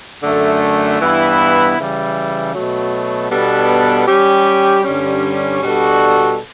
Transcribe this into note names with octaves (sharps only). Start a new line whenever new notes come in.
F#2 D3 A3
G2 E3 B3 E4
C#3 E3 G3
B2 F#3 A3
B2 G3 B3 D4 A4
G3 C#4 G4
G2 D3 G3 C#4
B2 G3 D4 F#4 A4